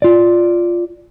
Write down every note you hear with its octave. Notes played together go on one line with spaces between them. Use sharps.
F4 D5